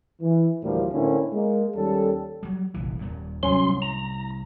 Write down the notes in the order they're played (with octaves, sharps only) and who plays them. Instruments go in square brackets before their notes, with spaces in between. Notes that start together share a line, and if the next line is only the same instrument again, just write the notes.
[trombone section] E3
D2 A2 E3 F3 G3 A#3
A2 D3 A#3 C4 C#4 E4
G#3 A#3
D#2 G3 C#4 A4
[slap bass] F#3 G3
F1 A#1 E3
D#1 D#2 A#2
[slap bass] C2 A2 [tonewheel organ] F#3 C#4 C6
[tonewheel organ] A#5